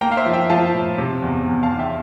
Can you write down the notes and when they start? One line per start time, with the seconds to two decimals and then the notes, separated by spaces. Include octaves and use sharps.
0.01 A#3 G5 A#5
0.12 F5
0.17 C5 E5
0.26 F3
0.33 E5 G5
0.50 F3 F5 A5
0.74 A2
0.98 C3
1.22 E2
1.46 E2
1.63 F5 A5
1.71 E2
1.79 E5 G5